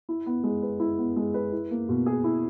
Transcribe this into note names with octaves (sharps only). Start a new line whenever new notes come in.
E4
B3
G#3
B4
E4
B3
G#3
B4
E4
A#3
B2
G#4
E4